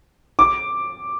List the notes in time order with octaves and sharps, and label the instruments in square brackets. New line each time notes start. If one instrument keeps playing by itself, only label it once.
[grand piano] D6